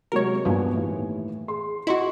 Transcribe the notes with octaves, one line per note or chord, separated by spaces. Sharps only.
C3 F#3 G#3 A#4 C#5
G2 A#2 F3 B3 D4 G#5
D#2 A2 E3
G#4 C6
E4 F#4 D#5 C6 C#6